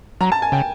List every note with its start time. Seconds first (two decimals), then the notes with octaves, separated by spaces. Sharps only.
0.21 F#3 A#5
0.32 A5
0.42 G#5
0.52 C#3 G5